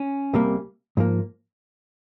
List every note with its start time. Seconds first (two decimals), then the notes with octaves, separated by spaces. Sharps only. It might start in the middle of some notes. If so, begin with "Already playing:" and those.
Already playing: C#4
0.33 C2 C3 G3 A#3
0.97 G#2 F3 A#3